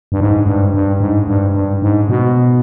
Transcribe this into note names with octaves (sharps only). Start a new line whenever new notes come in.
G2
G#2
G2
G2
G#2
G2
G2
G#2
B2